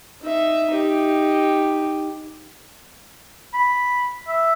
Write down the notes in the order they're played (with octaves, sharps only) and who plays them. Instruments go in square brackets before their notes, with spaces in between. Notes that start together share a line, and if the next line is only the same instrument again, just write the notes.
[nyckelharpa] D#4 E5
D#4 G4
[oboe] B5
E5